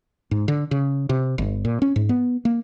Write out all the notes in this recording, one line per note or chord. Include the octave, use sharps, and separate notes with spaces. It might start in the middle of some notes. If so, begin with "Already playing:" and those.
G#2
D3
C#3
C3
G1
A#2
C#4
G#2
B3
A#3